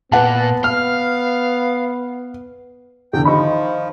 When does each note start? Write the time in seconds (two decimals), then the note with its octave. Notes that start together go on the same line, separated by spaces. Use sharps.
0.12 A#2 B3 B4 F#5 A5
0.64 F5 F6
3.13 E2 D3 G5
3.25 D#3 F3 D#5 B5 C#6